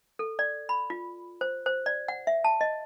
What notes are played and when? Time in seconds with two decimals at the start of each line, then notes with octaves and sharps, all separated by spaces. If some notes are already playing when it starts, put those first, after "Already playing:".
0.19 A4
0.39 D5
0.69 B5
0.90 F4
1.41 C5
1.66 C5
1.86 D5
2.08 F#5
2.27 E5
2.44 A5
2.61 D#5